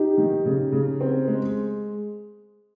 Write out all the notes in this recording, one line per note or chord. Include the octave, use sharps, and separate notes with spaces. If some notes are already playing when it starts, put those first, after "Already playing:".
Already playing: D#4 G4
D#3
C#3
C#3
C4
G#3